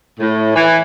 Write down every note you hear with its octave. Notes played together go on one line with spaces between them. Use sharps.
A2
E3